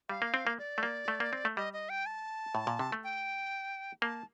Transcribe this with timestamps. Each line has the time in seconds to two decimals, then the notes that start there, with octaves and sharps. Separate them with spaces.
0.09 G3 F5
0.22 A#3
0.34 C4
0.47 A#3
0.59 D5
0.78 A3
0.83 A#3
1.08 A3
1.20 A#3
1.33 C4
1.45 A3
1.57 G3 D#5
1.73 D#5
1.89 G5
2.06 A5
2.55 A2
2.67 A#2
2.79 C3
2.92 A3
3.04 G5
4.02 A#3 A5